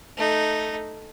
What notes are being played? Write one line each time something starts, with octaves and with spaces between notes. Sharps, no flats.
A3 D#4